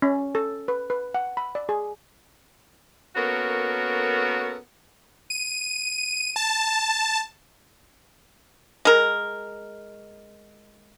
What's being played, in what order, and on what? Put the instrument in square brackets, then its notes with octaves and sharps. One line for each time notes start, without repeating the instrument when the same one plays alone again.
[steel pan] C#4
A4
B4
B4
F#5
B5
D5
G#4
[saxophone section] A#3 B3 C#4 F#4 A4 A#4
[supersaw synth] D#7
A5
[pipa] G#3 A#4